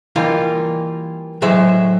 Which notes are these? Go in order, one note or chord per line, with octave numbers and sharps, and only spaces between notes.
E3 G3 A#3 D#4 F4
A2 F#3 G#3 C5 E5